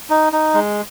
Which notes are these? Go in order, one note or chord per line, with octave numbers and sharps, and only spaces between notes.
D#4
D#4
G#3